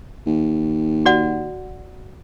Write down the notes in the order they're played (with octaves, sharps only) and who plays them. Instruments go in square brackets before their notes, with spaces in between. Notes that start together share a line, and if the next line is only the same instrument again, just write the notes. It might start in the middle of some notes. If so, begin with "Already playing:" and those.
[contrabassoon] D#2
[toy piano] F#4 D5 F#5